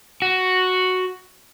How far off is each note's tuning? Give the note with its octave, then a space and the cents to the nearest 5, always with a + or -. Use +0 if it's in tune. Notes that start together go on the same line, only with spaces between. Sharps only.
F#4 +0